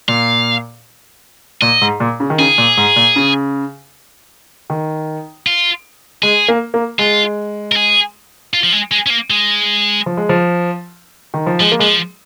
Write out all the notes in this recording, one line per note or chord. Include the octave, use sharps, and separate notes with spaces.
A#2 F5
A#2 D#5
G#2
A#2
C#3
D#3
C#3 G#4
A#2
G#2
A#2
C#3
D#3
F4
G#3 G#4
A#3
A#3
G#3 F4
A#4
G#4
F4
F3
G#3
G#3
C#4
A#3
G#3
F3
G#3
F3
D#3
F3
F3 G#3
A#3
F3 G#3